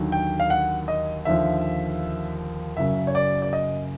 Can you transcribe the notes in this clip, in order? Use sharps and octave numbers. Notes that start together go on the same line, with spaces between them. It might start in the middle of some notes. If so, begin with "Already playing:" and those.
Already playing: D#2 D3 F#3
G5
F5
F#5
D#5
D#2 D3 F3 E5
F#1 F#2 C#3 F#3 E5
C#5
D5
D5
D#5